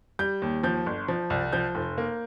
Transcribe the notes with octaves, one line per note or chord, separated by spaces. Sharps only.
G3 G6
D#2
F3 G6
G1
F3
C2
F3 G6
F1
A#3